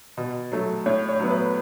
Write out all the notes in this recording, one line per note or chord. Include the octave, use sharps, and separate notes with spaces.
B2
F#3 A3
A2 C#5
C#5
F#3 B3
B4